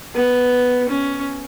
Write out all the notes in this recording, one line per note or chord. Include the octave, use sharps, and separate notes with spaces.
B3
C#4